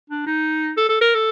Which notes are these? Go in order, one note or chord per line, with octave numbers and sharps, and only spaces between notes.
D4
D#4
A4
A4
A#4
A4